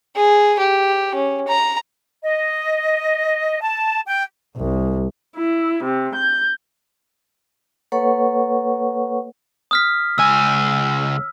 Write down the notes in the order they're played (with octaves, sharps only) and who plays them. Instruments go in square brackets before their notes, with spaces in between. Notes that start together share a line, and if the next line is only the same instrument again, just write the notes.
[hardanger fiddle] G#4
G4
C#4
A#5
[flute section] D#5
A5
G5
[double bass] C2
[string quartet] E4
C3
G6
[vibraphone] A#3 A4 B4 C#5 F#5 C#6
[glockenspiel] D#6 F6 B6
[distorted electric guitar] C#2 G#5 [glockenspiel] E6